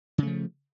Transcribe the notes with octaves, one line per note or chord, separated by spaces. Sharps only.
C#3 F3 A3